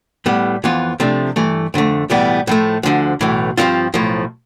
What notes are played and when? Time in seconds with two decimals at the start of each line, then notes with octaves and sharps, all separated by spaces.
0.26 A2 G3 B3
0.64 F2 E3 B3 F4
1.00 C3 F3 A3 D4
1.36 G2 E3 A3
1.74 F2 D3 A3
2.10 B1 A2 E3 G3 B3
2.47 A2 F3 A3
2.83 D2 D3 F3
3.21 B1 A2 E3
3.57 G2 F3 C4 F4
3.94 B1 A2 F3